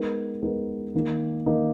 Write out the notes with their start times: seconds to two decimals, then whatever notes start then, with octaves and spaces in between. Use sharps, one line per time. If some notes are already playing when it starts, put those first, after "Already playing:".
Already playing: G#3 B3 D#4 A#4
0.42 G#3 B3 D#4 A#4
0.95 D#3 A#3 D#4
1.46 D#3 A#3 D#4